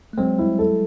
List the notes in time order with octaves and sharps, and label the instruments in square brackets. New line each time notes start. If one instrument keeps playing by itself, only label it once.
[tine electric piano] A3
[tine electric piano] F#3 G#3 [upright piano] C4
[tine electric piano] G3 [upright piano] E4
[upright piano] A4